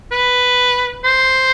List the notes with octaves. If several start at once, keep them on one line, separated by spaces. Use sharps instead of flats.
B4
C5